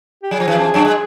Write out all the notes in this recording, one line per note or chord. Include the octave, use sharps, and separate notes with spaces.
G4
F#3 G#4
F3
E3
F2 F3
F#2 F#3
G#3